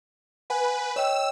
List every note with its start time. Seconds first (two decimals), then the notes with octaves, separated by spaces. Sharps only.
0.50 B4 F#5 G#5
0.96 C#5 D#5 G5 E6